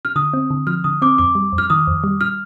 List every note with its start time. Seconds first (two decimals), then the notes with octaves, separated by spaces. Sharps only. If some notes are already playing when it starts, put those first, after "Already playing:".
0.05 F6
0.16 D3 D#6
0.34 C4
0.50 D3
0.67 F3 F6
0.84 D3 D#6
1.02 C4 D6
1.18 F2 D6
1.35 G3
1.53 F2
1.58 F6
1.70 D#3 D#6
1.87 F2
2.04 G3
2.21 F6